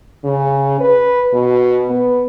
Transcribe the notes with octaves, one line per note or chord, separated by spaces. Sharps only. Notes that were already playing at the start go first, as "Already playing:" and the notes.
C#3
B4
B2
B3